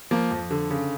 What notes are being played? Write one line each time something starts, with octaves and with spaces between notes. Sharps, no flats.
F3 A#3
F2
D3
C#3